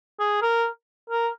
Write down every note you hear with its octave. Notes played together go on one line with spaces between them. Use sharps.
G#4
A#4
A#4